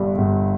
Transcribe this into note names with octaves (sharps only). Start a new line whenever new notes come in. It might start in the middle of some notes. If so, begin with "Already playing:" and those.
Already playing: G1 G2 G3
G1